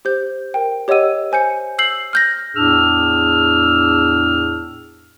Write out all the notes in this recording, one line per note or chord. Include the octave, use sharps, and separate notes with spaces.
G4 C5 G6
A#4 G5
G4 C#5 D#5 F#5 E6 D#7
C5 G#5 G6 C#7
E6 G6 C7 F#7
F6 G6 A#6
E2 A2 D4 G#4 E6 F6